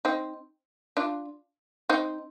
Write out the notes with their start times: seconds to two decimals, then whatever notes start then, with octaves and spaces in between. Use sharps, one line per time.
0.05 C4 D#4
0.97 D4 F4
1.89 C4 D#4